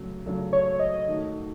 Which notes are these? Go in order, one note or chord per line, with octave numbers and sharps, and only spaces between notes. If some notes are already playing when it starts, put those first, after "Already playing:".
Already playing: C#3 F#3 A3
C#3 F#3 A3
C#5
D#5
D#3 A3 D#4 F#4